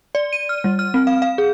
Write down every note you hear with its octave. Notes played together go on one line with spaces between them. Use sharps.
D5
D#7
F6
G3
F6
C4
F5
F5
G#4